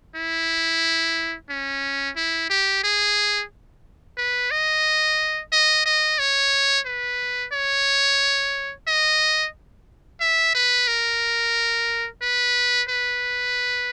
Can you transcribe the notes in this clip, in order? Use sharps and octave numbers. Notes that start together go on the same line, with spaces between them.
E4
C#4
E4
G4
G#4
B4
D#5
D#5
D#5
C#5
B4
C#5
D#5
E5
B4
A#4
B4
B4